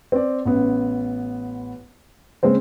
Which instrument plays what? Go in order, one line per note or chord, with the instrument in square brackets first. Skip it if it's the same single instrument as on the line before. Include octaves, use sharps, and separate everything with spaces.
[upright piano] C4 D5
A1 B3
C#3 G#3 A#3 C4 C5